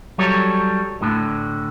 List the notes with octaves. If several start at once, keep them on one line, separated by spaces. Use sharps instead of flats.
F#3 G3 A4 C#5
D2 A2 D3